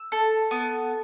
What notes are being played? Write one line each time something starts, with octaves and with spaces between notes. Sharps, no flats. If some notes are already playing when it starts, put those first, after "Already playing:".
Already playing: E6
A4
B3